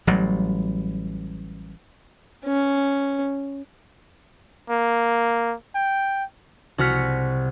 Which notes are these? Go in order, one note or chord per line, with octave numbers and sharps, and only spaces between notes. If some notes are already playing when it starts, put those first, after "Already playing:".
A1 F#3 G3
C#4
A#3
G5
C2 F#4 F6 B6 C#7